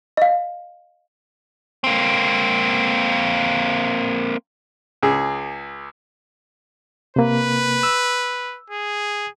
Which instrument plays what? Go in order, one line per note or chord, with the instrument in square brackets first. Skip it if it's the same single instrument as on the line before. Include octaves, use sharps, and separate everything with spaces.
[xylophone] D#5 F5
[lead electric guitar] A#3 C4
[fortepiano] C#2 G#4
[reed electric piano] C3 A#3 [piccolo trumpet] B4
[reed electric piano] E6
[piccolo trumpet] G#4